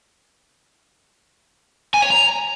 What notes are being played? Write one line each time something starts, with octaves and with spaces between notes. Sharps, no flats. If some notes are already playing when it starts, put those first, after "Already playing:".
G#5
C#5
A#5